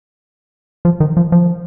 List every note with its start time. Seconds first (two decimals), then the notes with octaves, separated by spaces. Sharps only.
0.85 F3
1.00 D#3
1.17 F3
1.32 F3